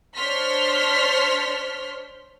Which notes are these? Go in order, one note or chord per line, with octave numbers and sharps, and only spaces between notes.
D4 C5 C#5 C6 F6 B6